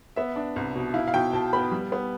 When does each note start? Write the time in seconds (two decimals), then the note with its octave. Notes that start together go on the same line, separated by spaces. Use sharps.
0.16 B3 E5
0.36 D4
0.56 C2
0.76 B2
0.94 E4 F5
1.08 F5
1.14 B2 G5
1.33 B2 A5
1.53 B3 B5
1.72 G3
1.92 B3